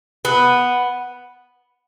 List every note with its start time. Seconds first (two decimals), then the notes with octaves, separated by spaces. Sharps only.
0.25 B3